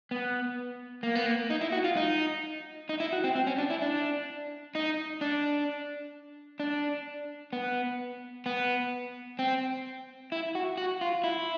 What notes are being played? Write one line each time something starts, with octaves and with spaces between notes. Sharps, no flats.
B3
A#3
B3
A#3
D#4
E4
F#4
F4
D#4
D#4
E4
F#4
C4
C4
C#4
D4
E4
D4
D#4
D4
D4
B3
B3
C4
E4
F#4
F#4
F4
E4